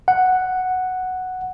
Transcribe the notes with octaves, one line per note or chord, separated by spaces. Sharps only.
F#5